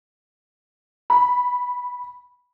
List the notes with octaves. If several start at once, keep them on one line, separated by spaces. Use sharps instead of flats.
B5